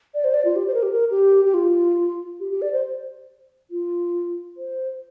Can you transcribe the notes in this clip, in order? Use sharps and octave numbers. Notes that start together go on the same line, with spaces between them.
D5
C5
D5
F4
G4
C5
A#4
G4
A#4
G4
G4
F4
G4
G4
D5
C5
F4
C5